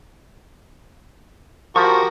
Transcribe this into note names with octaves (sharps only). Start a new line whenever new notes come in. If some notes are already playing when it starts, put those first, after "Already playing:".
F3 F#4 G4 A#4 C#6